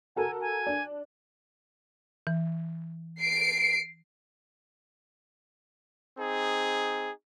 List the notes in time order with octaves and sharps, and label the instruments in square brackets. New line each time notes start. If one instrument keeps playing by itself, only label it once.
[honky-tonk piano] F#4 A4 A#4 [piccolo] G#5
[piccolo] G#5
[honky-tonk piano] D4
[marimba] E3
[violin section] C7 D7
[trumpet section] C4 D#4 G#4